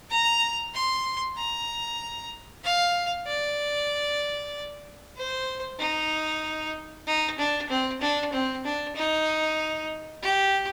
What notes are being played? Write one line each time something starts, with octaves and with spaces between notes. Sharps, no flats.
A#5
C6
A#5
F5
D5
C5
D#4
D#4
D4
C4
D4
C4
D4
D#4
G4